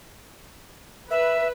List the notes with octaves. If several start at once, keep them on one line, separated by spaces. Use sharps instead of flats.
B4 E5